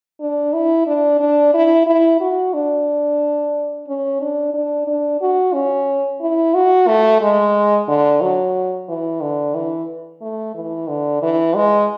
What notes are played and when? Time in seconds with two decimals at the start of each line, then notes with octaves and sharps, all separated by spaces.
0.20 D4
0.53 E4
0.87 D4
1.20 D4
1.54 E4
1.86 E4
2.20 F#4
2.53 D4
3.87 C#4
4.21 D4
4.54 D4
4.87 D4
5.21 F#4
5.54 C#4
6.21 E4
6.54 F#4
6.88 A3
7.21 G#3
7.88 D3
8.21 F#3
8.89 E3
9.21 D3
9.54 E3
10.21 A3
10.55 E3
10.88 D3
11.22 E3
11.55 G#3